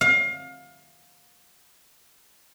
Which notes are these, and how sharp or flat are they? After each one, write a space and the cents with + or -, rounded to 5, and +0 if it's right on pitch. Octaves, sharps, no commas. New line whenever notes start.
F5 +30